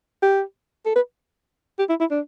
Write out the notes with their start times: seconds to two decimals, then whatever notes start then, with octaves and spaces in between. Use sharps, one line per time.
0.23 G4
0.86 A4
0.96 B4
1.79 G4
1.89 E4
2.00 E4
2.11 D4